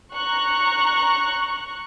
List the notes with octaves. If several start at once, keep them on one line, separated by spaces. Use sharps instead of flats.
A#5 C#6 F#6